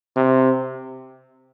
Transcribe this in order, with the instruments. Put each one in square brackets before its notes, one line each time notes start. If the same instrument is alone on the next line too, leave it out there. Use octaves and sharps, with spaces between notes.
[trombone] C3